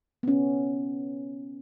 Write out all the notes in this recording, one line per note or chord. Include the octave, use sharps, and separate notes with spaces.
B3 C#4